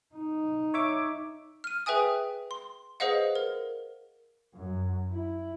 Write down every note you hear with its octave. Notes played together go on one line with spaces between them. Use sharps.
D#4
C#5 E5 D6
F6 D#7
G#4 B4 E5 G5 G#5 D#6
C6
G#4 B4 C5 D#5 F5 F#5
A#4
F#2
E4